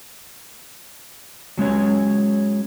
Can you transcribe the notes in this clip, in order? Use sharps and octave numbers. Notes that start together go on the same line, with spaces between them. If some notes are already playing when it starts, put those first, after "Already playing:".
F#3 G#3 C#4 C#5